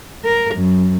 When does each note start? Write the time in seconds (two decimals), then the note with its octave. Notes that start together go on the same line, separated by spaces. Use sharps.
0.25 A#4
0.55 F#2